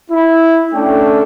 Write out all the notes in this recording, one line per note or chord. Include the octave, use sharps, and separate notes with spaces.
E4
A3 C#4 D4 A4 G5